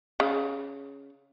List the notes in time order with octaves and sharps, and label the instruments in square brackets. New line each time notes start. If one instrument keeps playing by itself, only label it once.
[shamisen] C#3